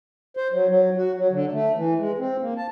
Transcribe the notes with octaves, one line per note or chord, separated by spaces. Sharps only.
C5
F#3
F#3
F#4
F#3
D3
A3
E3
G#3
C4
A#3
A5